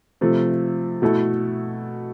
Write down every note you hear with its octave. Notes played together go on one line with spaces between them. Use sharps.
C3 F3 A3
B2 A3 E4 A4